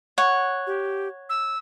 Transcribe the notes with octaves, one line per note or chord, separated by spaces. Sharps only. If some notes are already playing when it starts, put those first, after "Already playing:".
C#5 F#5
G4
E6